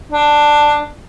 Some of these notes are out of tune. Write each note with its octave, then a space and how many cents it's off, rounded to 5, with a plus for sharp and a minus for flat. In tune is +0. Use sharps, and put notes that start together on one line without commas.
D4 +10